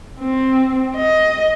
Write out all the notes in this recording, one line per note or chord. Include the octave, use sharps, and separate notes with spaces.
C4
D#5